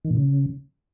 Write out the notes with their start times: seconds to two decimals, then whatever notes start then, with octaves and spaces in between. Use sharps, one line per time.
0.05 D#3
0.11 A#2
0.17 C#3